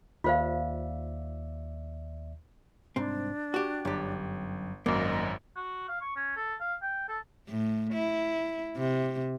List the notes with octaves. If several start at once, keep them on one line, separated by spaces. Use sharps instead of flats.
D#2 F4 C5 D5 E5 F5
C2 G#2 C4 D4
F#4 G4
G1 F#2 G4
G#1 F#2 A#3 D#5
F#4
F5
C#6
C#4
A4
F5
G5
A4
A2
E4
C3